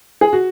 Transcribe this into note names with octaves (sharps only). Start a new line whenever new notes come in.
G#4
F#4